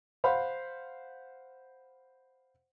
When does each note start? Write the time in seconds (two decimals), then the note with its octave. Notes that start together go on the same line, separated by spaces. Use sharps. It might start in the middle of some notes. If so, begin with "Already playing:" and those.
0.24 C5 F5 F#5 B5